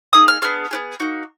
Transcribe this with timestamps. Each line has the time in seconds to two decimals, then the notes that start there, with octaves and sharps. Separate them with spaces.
0.13 A#3 D#4 G#4 D#6
0.28 F6
0.42 B3 D4 G#4 F6
0.71 B3 D4 G#4
1.00 A#3 D#4 F#4